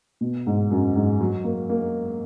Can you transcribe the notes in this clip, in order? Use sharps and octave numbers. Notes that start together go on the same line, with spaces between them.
B2
G#2
F#2
G#2
F#3
A#3
A#3